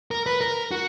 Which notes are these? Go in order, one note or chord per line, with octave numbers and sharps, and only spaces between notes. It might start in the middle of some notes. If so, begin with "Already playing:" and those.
A#4
B4
A#4
F#4